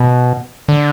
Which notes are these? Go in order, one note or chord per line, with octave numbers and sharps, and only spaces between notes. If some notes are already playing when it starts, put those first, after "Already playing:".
Already playing: B2
D3